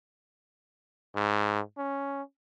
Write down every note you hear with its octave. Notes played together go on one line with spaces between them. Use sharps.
G#2
C#4